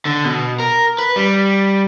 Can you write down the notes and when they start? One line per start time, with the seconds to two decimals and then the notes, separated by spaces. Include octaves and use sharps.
0.05 D3
0.25 B2
0.60 A#4
0.99 B4
1.16 G3